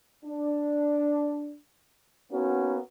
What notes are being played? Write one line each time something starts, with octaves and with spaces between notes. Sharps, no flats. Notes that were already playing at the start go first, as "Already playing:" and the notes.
D4
A#3 B3 C#4 D#4 F#4